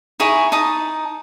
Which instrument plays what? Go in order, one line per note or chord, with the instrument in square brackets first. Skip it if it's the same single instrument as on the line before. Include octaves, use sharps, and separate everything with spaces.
[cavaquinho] D#4 E4 G#4 C#5
D#4 A5 D#6